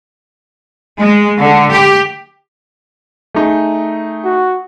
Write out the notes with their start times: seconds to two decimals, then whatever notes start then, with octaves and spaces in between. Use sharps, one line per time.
0.98 G#3
1.38 D3
1.72 G4
3.35 A3 D#4 G#4
4.24 F#4